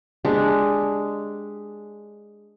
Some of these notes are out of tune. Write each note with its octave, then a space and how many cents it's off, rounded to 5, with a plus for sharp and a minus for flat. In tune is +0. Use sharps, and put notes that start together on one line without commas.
G#3 +0 D4 +0 G4 +0